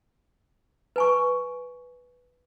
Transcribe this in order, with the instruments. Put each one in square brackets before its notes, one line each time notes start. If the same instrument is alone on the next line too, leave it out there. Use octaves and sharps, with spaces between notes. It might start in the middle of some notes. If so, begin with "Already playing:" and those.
[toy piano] B4 G#5 C#6